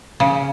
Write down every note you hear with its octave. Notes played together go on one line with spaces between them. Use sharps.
C#3